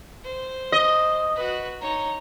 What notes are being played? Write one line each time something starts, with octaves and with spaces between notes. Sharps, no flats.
C5
D#5 D#6
F#4 B4
D#4 C#5 A#5